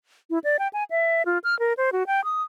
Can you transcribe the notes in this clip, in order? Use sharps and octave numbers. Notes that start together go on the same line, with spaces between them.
E4
D5
G5
G#5
E5
F4
F6
A#4
C5
F#4
G5
D#6